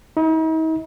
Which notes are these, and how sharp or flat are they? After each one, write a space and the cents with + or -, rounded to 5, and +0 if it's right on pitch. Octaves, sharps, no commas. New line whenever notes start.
D#4 +45